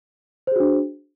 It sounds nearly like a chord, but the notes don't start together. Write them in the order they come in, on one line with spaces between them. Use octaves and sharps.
C5 G#4 F#4 D4